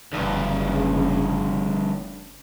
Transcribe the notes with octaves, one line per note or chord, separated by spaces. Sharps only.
F#1 D2 G2 C#3